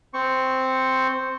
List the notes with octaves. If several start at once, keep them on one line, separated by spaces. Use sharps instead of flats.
C4 C#6